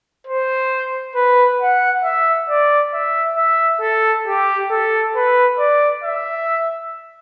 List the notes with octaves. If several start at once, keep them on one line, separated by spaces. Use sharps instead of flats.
C5
B4
F#5
E5
D5
E5
E5
A4
G4
A4
B4
D5
E5